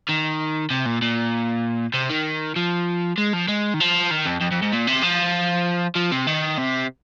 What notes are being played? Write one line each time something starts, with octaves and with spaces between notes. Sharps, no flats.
D#3
C3
A#2
A#2
C3
D#3
F3
G#3
F3
G#3
D#3
F3
D#3
F2
F2
F2
G#2
A#2
C3
F3
F3
C3
D#3
C3